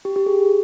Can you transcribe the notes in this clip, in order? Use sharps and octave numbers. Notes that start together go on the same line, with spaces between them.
G4
G4
G#4